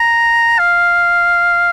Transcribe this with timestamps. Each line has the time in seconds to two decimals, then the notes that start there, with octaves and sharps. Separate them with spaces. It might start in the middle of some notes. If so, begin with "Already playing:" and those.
Already playing: A#5
0.59 F5